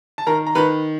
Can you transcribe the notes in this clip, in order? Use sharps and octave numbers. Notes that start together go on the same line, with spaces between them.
A5
D#3 A#4 A#5
A#5
D#3 B4 B5